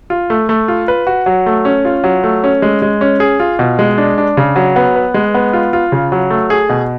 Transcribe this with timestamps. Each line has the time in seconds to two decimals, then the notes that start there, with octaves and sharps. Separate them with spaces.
0.10 F4
0.30 A3
0.49 A3
0.68 F4
0.88 B4
1.07 F#4
1.26 F#3
1.46 A3
1.65 C#4
1.85 F4
2.04 F#3
2.24 A3
2.44 C#4
2.62 G#3
2.82 G#3
3.01 C#4
3.20 G#4
3.40 F4
3.59 B2
3.79 G#3
3.98 D4
4.18 D4
4.37 C#3
4.56 F#3
4.76 B3
4.96 B4
5.14 G#3
5.34 B3
5.53 F4
5.73 F4
5.92 C#3
6.12 F#3
6.30 A3
6.50 G#4
6.69 B2